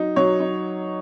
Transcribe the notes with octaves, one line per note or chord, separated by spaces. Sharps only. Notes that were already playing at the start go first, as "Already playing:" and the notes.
Already playing: F#3 D#4
F#3 C#5
D#4